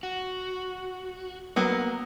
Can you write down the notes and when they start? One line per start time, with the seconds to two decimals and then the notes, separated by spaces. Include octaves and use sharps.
0.03 F#4
1.56 F#3 A#3 B3